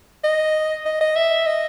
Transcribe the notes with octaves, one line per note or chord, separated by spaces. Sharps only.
D#5
D#5
D#5
E5
D#5